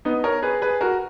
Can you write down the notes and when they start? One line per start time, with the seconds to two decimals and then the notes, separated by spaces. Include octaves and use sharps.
0.05 B3 D#4
0.24 A#4 C#5
0.43 G#4 B4
0.62 G#4 B4
0.81 F#4 A#4